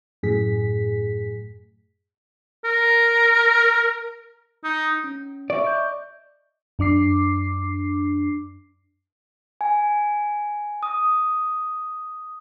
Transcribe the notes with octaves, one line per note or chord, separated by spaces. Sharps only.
F#2 A2 G#4 B6
A#4
D#4
C#4
D5 E5 C#6 D6
D#5 G6
F#2 D4 D6 C7
G#5
D#6